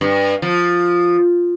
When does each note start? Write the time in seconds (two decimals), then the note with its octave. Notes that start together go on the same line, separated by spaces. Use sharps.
0.01 G2
0.42 F3